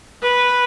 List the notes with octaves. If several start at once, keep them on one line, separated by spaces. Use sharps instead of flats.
B4